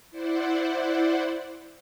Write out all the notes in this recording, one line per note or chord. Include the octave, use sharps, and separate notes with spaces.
E4 C5 D5 F#5